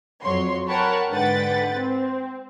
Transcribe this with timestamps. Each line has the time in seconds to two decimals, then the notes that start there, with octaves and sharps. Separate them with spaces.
0.22 F2 F#3 C#5 C6
0.66 A#4 C#5 F#5 G5 A5 B5
1.09 G#2 D3 B4 F#5 G5 A6
1.74 C4